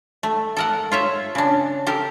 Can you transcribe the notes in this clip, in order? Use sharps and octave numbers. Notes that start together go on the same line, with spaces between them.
A3
A4 A#4 F#5
F4 C#5 E5
C#3 D4
G4 A4 A#4